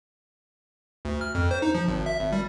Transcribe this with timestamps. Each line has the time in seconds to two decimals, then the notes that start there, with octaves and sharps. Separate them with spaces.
1.05 D2
1.21 F6
1.35 F2
1.51 C5
1.62 D#4
1.75 F3
1.88 G#1
2.06 E5
2.20 G#1
2.33 G3